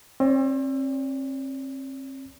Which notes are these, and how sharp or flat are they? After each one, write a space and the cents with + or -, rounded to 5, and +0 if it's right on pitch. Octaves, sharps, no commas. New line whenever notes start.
C4 +40 D5 -35